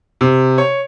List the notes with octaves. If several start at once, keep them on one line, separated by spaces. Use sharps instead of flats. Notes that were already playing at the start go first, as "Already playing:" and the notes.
C3
C#5